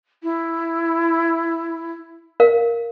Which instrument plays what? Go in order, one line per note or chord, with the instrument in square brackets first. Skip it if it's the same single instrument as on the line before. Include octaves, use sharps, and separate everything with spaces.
[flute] E4
[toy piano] A#4 F5